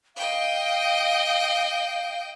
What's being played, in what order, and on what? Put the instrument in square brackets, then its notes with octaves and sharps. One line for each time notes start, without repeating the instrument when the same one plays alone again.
[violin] D#5 G5 [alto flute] F5